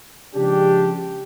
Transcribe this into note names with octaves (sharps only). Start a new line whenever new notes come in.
C#3 F3 G#3 D4 G4